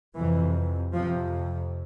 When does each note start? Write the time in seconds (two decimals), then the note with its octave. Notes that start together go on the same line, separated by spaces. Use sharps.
0.16 F2 C3 E3
0.94 F2 C3 F3